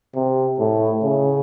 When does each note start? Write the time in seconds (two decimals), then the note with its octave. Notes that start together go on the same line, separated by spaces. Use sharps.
0.15 C3
0.59 A2
1.04 C#3